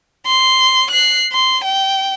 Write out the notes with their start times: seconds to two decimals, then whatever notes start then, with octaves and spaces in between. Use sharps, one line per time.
0.27 C6
0.90 F#6 C7
1.32 C6
1.64 G5